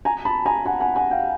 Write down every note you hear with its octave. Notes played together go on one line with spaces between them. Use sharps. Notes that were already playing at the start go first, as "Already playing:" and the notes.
G#5 A#5
A5 B5
G#5 A#5
F#5 G#5
F#5 G#5
F#5 G#5
F5 G5